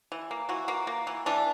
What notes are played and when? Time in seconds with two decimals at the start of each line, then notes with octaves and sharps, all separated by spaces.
0.12 E3
0.31 A#3
0.49 E3 F#4
0.68 A#3
0.87 A#3
1.07 E3
1.26 E3 D4